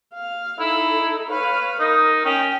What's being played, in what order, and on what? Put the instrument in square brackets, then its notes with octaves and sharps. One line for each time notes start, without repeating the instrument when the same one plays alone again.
[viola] F5
[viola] D#4 A4 [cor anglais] E4
[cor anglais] B4 [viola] C#5 F5
[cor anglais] D#4 [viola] A#4
[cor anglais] C#4 [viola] G5